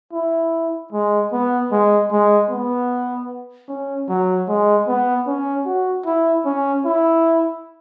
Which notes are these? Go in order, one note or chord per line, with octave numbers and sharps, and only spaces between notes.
E4
G#3
B3
G#3
G#3
B3
C#4
F#3
G#3
B3
C#4
F#4
E4
C#4
E4